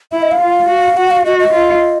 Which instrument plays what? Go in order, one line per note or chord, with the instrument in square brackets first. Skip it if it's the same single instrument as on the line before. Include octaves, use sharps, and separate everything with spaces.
[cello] E4 [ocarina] E5
[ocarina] D#5
F5
[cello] F4
F#4
[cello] F#4 [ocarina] F#5
[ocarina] F5
[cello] F#4 [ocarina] D#5
[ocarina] D#5
[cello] F4